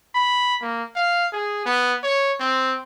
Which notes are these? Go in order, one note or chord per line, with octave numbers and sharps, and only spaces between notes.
B5
A#3
F5
G#4
B3
C#5
C4